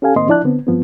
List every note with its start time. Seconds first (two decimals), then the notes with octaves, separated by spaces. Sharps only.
0.02 C#4 G4 A4 F5 G#5
0.16 A2 D#3 A#3 C4 D#5 C6
0.27 F3 D4 E4 D5 A5 F#6
0.44 D3 B3 C4
0.67 G2 F3 B3 C4